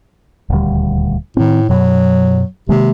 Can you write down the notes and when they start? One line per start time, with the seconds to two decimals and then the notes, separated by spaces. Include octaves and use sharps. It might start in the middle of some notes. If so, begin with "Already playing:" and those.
0.50 D#1 D2 G3
1.37 A2 D#3 C4
1.69 F#2 B2 F#3
2.69 C3 D#3 G#3 A#3